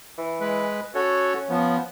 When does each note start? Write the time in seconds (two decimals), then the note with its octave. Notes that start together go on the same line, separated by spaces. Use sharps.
0.18 E3
0.41 G#3 B4
0.95 C#4 F#4 A4 C#5
1.50 F3 B3